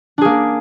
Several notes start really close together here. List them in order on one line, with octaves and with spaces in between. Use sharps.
D4 G#4 A#3